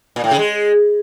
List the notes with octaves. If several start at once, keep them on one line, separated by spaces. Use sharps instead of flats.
A#2
A2
C#3
G#3